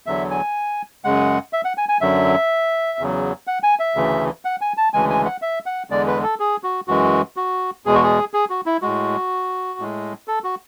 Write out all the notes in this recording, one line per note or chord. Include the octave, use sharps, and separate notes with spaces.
E2 D3 F#3 E5
G#5
F#2 C#3 G#3 F#5
E5
F#5
G#5
G#5
F#2 D3 F#3 E5
E2 C#3 F#3
F#5
G#5
E5
D2 C#3 E3
F#5
G#5
A5
D2 C#3 E3 G#3 G#5
G#5
F#5
E5
F#5
E2 D3 G#3 D5
B4
A4
G#4
F#4
F#2 E3 G#3 F#4
F#4
E2 B2 G#3 G#4
F#4
G#4
G#4
F#4
E4
A2 G#3 F#4
A2 G#3
A4
F#4